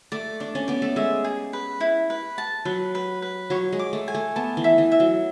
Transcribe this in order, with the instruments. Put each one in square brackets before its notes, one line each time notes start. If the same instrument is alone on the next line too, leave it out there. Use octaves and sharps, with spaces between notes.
[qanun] A3 [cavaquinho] D5
[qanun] D4 [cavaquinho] D5
[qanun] C#4
[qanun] B3 [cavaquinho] D5
[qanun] A3
[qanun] G#3 [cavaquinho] E5
[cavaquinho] G#4
B4
E4
B4
A5
[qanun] F#3 [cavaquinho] B4
[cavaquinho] B4
B4
[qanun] F#3 [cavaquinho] C#5
[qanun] G#3
[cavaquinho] D6
[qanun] A3
[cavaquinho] G#5
[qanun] A3
[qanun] B3 [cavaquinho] A5
[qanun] E3
[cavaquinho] E5
[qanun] E3
[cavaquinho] E5
[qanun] F#3